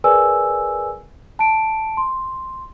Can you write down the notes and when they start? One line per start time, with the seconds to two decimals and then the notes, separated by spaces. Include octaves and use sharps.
0.04 G#4 A#4 B4 D5 G#5 E6
1.39 A5 D7
1.97 C6